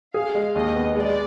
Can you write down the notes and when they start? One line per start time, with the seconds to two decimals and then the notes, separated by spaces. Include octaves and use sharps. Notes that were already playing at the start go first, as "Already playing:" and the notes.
0.14 G#4 F5
0.35 G#3
0.55 D#2 D#5
0.76 B3
0.96 G#3 D5